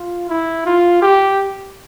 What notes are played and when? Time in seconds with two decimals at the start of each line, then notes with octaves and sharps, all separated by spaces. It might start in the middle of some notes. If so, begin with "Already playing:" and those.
Already playing: F4
0.29 E4
0.66 F4
1.02 G4